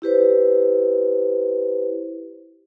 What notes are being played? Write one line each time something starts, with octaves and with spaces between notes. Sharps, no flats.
E4 G4 B4 C5